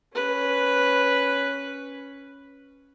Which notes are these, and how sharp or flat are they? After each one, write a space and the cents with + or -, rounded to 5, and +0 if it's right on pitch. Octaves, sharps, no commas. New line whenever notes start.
C#4 +0 B4 +0